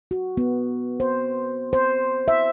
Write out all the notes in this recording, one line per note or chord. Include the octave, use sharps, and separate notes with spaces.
F#4
B3
C5
C5
E5